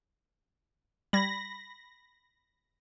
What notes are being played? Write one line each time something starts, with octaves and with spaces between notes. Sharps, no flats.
G3 B5 G#6 A#6